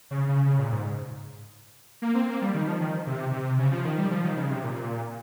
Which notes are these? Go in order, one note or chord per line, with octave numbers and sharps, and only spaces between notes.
C#3
C#3
C#3
A#2
G#2
A#3
C4
A#3
G3
D#3
F3
D#3
C3
C3
C#3
F3
D#3
G3
F3
D#3
C#3
C3
A#2